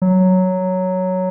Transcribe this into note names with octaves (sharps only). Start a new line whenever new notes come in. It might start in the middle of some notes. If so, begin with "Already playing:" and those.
F#3